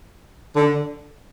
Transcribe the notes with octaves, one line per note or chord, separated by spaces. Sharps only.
D3